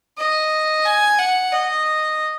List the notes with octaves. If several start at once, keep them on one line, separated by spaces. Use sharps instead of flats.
D#5
G#5
F#5
D#5